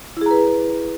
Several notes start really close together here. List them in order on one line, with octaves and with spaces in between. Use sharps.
E4 G#4 A#5 B4